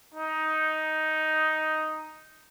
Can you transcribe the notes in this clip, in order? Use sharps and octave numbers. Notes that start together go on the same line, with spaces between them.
D#4